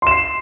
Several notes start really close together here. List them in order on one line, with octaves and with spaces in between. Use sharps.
C6 E7 C7